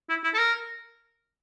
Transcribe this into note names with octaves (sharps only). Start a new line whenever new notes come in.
E4
E4
A4
A#4